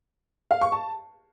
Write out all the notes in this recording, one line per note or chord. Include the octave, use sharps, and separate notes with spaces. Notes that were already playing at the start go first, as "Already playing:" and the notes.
F5
C#6
A5